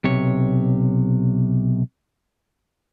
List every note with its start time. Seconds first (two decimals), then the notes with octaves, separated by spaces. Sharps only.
0.04 B1 C3 C#5